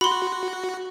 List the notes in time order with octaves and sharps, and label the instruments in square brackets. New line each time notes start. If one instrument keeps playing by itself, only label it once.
[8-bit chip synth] F#4 [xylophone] B5 C6